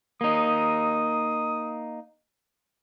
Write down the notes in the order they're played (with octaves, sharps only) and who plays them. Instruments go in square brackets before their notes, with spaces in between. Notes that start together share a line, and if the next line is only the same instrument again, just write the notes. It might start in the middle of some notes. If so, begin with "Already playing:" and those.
[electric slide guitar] A#3 D#4 [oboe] D#6